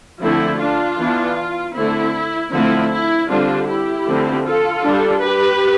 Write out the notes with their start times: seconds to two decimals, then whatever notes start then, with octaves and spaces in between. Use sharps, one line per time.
0.21 D3 F3 A3 C4 E4
0.59 D4 F4
0.98 E3 B3 D4
1.74 D3 A3 C4 E4
2.52 D3 F3 A3 C4 E4
2.91 E4
3.29 D3 G3 C4 D4 F4
3.68 E4 G4
4.06 D3 F3 A3 C4
4.45 F4 A4
4.84 G3 D4
5.22 G4 B4